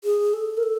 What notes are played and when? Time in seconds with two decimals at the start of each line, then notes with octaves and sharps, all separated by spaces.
0.04 G#4
0.33 A4
0.57 A#4
0.63 A4